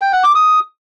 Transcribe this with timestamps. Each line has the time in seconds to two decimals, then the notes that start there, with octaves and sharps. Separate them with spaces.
0.01 G5
0.13 F#5
0.24 D6
0.35 D#6